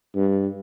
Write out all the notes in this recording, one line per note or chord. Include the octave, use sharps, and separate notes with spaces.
G2